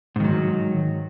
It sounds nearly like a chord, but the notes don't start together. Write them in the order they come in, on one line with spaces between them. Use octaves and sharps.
G#2 D#3 F#3